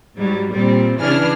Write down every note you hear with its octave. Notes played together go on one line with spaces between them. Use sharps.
G#2 F#3 G3
A#2 G3 C4
C#3 E3 D4 G#4 F6